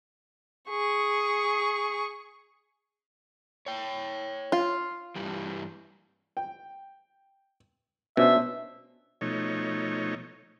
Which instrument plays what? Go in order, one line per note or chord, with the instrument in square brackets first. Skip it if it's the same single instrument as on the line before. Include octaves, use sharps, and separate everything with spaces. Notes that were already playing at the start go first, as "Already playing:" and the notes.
[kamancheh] G#4 C#6
[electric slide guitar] C#5 G5
[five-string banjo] F4
[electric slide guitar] G2 E3 G3
[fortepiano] G5
[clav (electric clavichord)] B2 [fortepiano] C#4 D4 C5 [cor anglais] E5
[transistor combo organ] B2 F3 A3 D#4 C#5